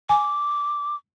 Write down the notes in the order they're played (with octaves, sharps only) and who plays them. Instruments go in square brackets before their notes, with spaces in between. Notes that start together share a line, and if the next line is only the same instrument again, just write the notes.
[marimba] G#5 [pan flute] D6